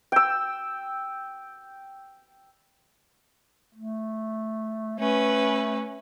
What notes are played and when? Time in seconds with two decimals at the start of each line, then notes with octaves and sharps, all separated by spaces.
0.12 G5 E6
3.75 A3
4.99 A3 C#4 B4